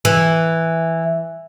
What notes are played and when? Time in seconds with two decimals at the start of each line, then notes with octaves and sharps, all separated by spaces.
0.05 E3